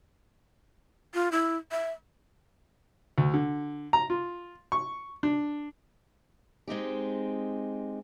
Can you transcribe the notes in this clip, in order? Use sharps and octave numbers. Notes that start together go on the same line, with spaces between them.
F4
E4
E5
D2
D3
A#5
F4
C#6
D4
G#3 C4 D#4 G4